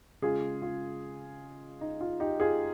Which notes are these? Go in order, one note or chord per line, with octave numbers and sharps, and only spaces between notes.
C#3 G#3 F4 G#4
F4
D#4
F4
D#4 G4
F4 G#4